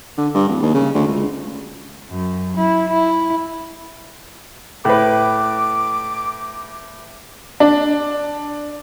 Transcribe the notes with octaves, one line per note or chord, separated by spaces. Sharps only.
D3
G2
D1
D#2
C#3
D2
C#2
F#2
E4
E4
A2 B4 D6
D4